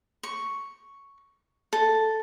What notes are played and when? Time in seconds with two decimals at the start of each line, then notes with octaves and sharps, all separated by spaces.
0.23 C#6
1.73 A4